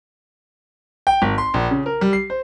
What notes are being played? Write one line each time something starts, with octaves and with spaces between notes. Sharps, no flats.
G5
G#1
C6
A#1
C#3
A#4
G3
C7
C5